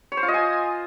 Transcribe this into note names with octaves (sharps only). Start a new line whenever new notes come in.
C#5
C5
F4
D#5
G#5